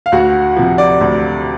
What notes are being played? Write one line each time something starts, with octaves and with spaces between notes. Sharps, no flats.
F5
D2 F#4 F#5
C3 F3
D5
D2